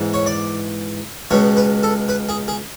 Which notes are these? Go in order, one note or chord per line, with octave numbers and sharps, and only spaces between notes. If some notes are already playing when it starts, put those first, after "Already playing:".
Already playing: G#2 E3 B3
C#5
D5
C#2 B2 G#3 C#5
B4
A4
B4
G#4
G#4